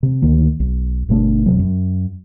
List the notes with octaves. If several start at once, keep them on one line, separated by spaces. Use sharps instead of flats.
C3
D2 D#3 A#3
B1
G1 B2 A3 D4
F1 C3 F#3
F#2